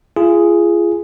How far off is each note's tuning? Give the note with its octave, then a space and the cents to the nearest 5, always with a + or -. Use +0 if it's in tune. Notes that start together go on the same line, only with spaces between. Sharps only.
F4 -35 G#4 +0